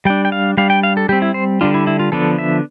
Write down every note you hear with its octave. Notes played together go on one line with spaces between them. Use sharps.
G3 D4 G5
G5
F5
G3 D4 F5
G5
F5
A4
G3 C4 G4
E4
C5
D3 G3 D4 F4
E4
E4
F4
D3 F3 B3 D4 A4
E5